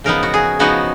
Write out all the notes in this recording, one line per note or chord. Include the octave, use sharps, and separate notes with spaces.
C#3 F3 B3 D#4 A#4
F#4
G#4
C#3 F3 B3 D#4 F#4